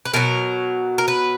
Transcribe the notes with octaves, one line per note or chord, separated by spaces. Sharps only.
B4
B2 F#3 A#4
A#4
B4